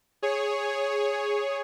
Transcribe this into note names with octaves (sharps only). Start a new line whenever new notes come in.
G#4 C#5